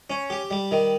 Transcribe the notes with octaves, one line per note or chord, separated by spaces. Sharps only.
C#4
G4
G3
D#3